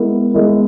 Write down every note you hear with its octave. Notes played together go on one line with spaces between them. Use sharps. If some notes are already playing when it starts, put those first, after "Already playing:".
Already playing: G#3 B3 E4 A#4
G#3 B3 E4 A#4